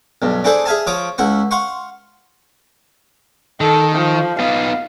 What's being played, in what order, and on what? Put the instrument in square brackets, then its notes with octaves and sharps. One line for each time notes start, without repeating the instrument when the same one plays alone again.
[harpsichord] B1 G2
D4 E4 G#4 A4 C5 D5
G#4 E5 F5 G#5 A5
F3 C#5 F5 D6 D#6
C#2 E4 F#5 C#6
F5 F#5 C6 C#6
[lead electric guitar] D#3 [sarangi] A4
[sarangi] F3
[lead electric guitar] B3 D#4 [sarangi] F5